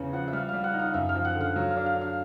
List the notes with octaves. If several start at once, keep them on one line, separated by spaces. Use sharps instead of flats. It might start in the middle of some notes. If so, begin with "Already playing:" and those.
Already playing: E2 C#3 C#4
F3 F#5
E5
G3 F5
G3 F5
F#5
D#4
F5
F#2 E5
F5
F3
F#5
D3
F5
F#3
F5
D4
F5
D4
F5